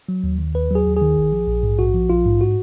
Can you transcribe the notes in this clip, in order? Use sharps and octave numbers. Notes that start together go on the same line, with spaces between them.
F#3
D#2
D#3
D#2 B4
F#3 G#4
D#2
G#4
D#3
A#1
F3
A#1
G#2
A#1 F#4
F3
A#1 F4
G#2
F#4